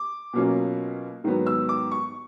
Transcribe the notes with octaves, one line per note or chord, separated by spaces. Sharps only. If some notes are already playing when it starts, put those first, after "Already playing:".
Already playing: D6
B2 F#3 A#3 C#4 F4
G#2 D#3 F#3 B3
E6
D6
C#6